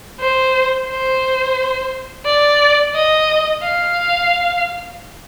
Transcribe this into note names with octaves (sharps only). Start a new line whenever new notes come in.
C5
C5
D5
D#5
F5